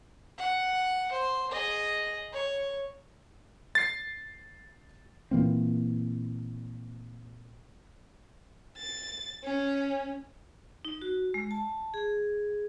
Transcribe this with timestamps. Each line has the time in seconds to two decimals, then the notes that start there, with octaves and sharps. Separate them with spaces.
0.38 F#5
1.12 C5
1.51 G#4 D#5
2.33 C#5
3.75 A6 C7
5.31 A#2 E3 A#3 C4
8.78 A6
9.44 C#4
10.85 D#4
11.02 F#4
11.34 G#3
11.51 A5
11.94 G#4